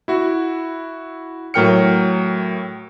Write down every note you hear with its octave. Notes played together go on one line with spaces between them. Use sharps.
E4 F#4
A2 F#3 A#4 G5 F6 C#7